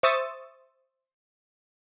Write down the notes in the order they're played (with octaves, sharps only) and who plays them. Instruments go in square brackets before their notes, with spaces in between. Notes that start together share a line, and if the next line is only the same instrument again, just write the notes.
[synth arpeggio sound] C5 E5 C#6 D#6 E6 A6